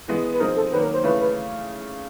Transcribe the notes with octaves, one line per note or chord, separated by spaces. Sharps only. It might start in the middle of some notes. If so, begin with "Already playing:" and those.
E3 G#3 B3
B4
F3 G#3 C4 D#4 A#4
A4
D#3 F#3 A#3 B4
A#4
C5
C#3 E3 A3 C#4 B4
B4